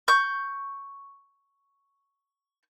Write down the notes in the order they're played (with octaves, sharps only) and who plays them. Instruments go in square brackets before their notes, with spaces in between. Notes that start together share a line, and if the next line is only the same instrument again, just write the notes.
[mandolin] C#6 G6